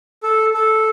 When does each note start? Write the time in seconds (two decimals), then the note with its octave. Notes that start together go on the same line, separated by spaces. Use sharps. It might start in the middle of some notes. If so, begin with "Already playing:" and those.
0.23 A4
0.54 A4